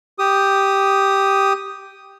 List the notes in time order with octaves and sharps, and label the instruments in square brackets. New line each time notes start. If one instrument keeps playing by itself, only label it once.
[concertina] G4 D#6